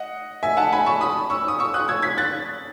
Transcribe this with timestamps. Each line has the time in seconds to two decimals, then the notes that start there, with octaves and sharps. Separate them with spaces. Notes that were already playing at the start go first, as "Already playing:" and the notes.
Already playing: D#5 F#5
0.43 E5 G#5
0.57 F#5 A5
0.72 G#5 B5
0.86 A5 C#6
1.01 B5 D#6
1.30 C#6 E6
1.48 D#6
1.59 C#6 E6
1.74 D#6 F#6
1.88 E6 G#6
2.02 G#6 B6
2.17 F#6 A6